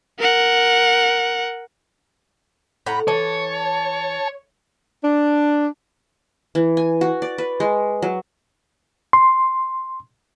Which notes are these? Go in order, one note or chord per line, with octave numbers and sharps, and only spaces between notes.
A#4 F#5
A2 F#5 A#5 B5
E3 C#5 A5
D4
E3
G#5
F#4
D5
B4
G#3
F#3
C6